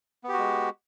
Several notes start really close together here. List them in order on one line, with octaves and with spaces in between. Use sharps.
B3 G4 F#4 G#3